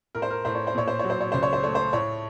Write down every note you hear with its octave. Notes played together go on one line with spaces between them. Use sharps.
A2 A#4
C5
A#4
A2 C5
C#5
C5
A#2 C#5
C5
F#3 C#5
C5
C#5
C#2 C5
C#5
C5
A3 C#5
C5
A2 C#5